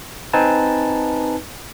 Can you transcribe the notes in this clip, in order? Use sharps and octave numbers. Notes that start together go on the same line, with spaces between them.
C4 D#4 B4 G#5 A5